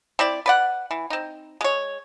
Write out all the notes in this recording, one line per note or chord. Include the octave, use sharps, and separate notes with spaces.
C4 E4 D5
B4 D5 F#5
E3
C4 D#4
G#3 C#5